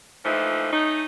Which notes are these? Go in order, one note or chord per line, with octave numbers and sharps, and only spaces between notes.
A#2 E3 F3 A3 D#4
A3 C#4 D#4